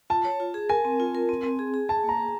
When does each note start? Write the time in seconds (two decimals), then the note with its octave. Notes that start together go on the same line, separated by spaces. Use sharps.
0.10 F4 A5
0.25 C#5
0.40 F4
0.54 G#4
0.69 A#4 G#5
0.85 C4
1.00 F4
1.15 A#4
1.29 C4
1.44 C4
1.59 G#4
1.74 G#4
1.89 G#4 A5
2.04 A#3
2.09 A#5
2.19 G#4